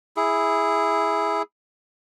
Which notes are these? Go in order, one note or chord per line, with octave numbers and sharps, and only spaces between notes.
E4 G#4